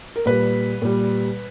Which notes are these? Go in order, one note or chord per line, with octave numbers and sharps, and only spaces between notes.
A#4
A#2 G3 B4
A#2 G3